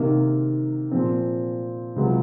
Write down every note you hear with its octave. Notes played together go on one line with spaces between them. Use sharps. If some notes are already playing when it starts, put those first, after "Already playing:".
Already playing: C3 D#3 A#3
A#2 F3 C4
C#2 C3 F#3